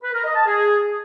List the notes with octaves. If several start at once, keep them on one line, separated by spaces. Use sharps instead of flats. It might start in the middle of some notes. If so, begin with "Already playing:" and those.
B4
A#4
D#5
A5
G#4